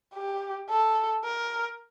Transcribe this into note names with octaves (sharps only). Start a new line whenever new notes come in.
G4
A4
A#4